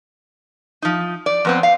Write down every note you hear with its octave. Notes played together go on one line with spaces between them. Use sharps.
F3 D#4
D5
F2 B3 C4
F5